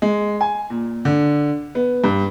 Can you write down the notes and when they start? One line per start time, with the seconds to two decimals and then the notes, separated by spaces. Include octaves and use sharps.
0.02 G#3
0.41 G#5
0.70 A#2
1.05 D3
1.75 B3
2.04 G2